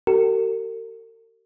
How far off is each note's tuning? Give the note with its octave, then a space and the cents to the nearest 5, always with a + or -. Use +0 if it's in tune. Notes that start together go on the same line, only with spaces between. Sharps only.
G4 -45 A#4 -45